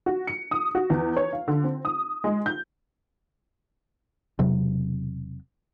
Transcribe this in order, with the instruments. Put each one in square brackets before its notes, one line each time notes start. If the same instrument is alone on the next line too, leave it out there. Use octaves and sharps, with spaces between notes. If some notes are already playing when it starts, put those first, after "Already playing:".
[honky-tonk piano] F#4
C#7
D#6
F#4
E2
C#5
F5
D3
C4
D#6
G#3
G6
[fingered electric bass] E1 C3 F#3